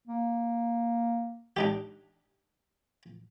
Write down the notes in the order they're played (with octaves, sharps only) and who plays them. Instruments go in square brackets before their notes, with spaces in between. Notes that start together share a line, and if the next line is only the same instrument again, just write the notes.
[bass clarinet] A#3
[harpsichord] D4 D#4 G4